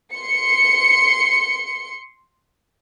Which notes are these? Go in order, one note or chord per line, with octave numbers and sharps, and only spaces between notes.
C6 C#7